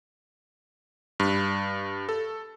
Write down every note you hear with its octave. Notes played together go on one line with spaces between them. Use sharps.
G2
A4